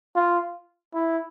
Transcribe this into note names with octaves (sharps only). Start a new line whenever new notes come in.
F4
E4